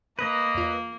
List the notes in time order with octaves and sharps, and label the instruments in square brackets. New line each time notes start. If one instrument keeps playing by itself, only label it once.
[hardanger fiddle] A#3 [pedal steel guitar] B4 D#5
[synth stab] E2 F4